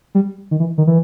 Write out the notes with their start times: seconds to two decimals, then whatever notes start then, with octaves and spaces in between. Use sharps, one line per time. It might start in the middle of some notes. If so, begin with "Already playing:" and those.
0.15 G3
0.51 D#3
0.60 E3
0.78 D#3
0.87 E3